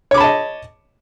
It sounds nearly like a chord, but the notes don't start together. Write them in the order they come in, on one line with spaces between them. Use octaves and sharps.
C#5 D6 B5 A5 D#5